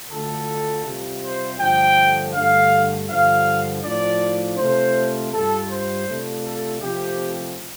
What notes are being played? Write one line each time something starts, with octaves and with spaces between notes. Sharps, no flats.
D2 D3 A3 F4 A4
C3 G3 F4
C5
G2 D3 F3 A3 G5
G2 D3 A3 F5
G2 D3 F3 F5
A2 F3 D4 F4 D5
C3 A3 F4 C5
G2 G3 F4 A4
C5
C3 A3 D4 F4
A4
C3 F3 A3 C4 G4